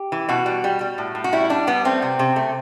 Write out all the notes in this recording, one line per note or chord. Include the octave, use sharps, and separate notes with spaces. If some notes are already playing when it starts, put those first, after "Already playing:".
Already playing: G4
E3
B2 F#4
G3
G3
G3
A2
A2
F#4
G3 E4
G3 D4
G3 B3
A3 C4
C3
C3
A3